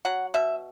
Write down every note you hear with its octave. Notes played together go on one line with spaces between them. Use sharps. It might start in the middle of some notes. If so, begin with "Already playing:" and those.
F#3 F#5
B2 E5